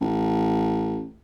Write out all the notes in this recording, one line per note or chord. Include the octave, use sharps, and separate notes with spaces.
A1